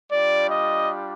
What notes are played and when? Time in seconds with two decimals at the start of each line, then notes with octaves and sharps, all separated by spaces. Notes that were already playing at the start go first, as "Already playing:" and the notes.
0.11 G3 D4 F4 D5
0.50 D#5